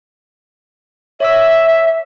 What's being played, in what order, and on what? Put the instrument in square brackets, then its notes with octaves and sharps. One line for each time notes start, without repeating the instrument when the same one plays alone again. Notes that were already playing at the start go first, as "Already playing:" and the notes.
[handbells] C#5 D6 E6 [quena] E5